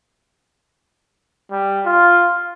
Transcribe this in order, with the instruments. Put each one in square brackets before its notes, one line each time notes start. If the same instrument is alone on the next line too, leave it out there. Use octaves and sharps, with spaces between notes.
[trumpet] G3
F4